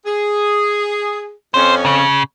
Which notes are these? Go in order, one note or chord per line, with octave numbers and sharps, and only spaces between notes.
G#4
F2 C#4 C5
C#3